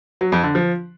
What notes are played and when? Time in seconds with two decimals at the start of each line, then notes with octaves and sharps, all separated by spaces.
0.21 F#3
0.32 F2
0.44 D3
0.55 F3